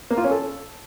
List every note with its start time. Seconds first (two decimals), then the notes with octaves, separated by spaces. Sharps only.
0.11 A#3
0.17 F4
0.24 C#4
0.31 A4